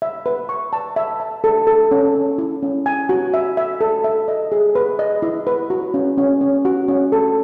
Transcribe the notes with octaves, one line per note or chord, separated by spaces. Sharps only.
E5
B4
C#6
A5
E5
A5
A4
A4
C#4
C#4
E4
C#4
G#5
F#4
E5
E5
A4
E5
D#5
G#4
B4
D#5
E4
B4
F#4
C#4
C#4
C#4
F#4
C#4
A4